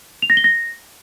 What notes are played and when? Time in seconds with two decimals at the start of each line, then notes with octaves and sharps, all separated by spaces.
0.22 F7
0.30 A#6
0.37 G7
0.44 A#6